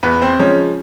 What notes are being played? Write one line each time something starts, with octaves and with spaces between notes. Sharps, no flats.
E2 B3 B4
C4 C5
C#3 F3 G#3 C#4 C#5